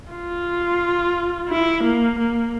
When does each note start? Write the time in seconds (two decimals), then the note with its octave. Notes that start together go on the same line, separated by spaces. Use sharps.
0.11 F4
1.49 E4
1.83 A#3
2.19 A#3